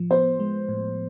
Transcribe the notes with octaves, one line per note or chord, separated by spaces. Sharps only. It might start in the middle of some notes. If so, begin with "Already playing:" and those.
Already playing: A2 F3
B3 C5
G#3
A2